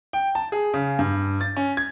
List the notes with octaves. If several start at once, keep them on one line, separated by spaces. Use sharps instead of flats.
G5
A5
G#4
C#3
G2
A6
C#4
G#6